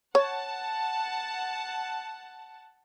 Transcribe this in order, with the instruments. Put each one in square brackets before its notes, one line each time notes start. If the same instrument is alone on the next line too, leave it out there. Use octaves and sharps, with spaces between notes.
[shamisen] C#5 [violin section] F#5 A5